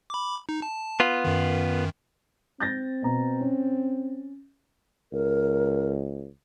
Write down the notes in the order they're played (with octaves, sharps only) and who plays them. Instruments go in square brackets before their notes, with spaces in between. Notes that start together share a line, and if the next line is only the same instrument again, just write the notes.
[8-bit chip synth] B5 D6
D#4
A5
[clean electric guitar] B3 F4
[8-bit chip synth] F#2 D#3
[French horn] C4 [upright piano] G6 A6 A#6
[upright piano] B2 A#5
C#4
[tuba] C#2 [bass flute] A#4